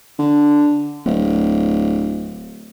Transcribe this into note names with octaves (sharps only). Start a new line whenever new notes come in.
D3
D1